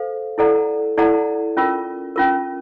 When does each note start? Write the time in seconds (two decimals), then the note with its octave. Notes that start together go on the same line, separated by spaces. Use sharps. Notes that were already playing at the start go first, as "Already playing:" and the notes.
Already playing: A4 C5 F5
0.38 E4 A4 D5 F#5 A#5
0.97 E4 A4 D5 F#5 A#5
1.57 C#4 F4 A#4
2.16 C#4 F4 A#4